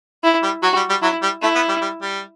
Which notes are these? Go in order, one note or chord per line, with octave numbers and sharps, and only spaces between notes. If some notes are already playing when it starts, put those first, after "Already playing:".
E4
G3
F#3 F#4
G3
G3
F#3 E4
G3
A3 E4
B3
G3
G3
G3